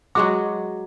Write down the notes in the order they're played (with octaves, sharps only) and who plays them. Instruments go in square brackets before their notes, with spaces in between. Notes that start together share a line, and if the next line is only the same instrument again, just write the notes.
[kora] F#3 G#3 F#4 [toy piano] D6